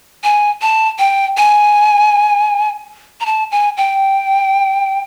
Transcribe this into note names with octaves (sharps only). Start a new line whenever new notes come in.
G#5
A5
G5
G#5
A#5
A5
G#5
G5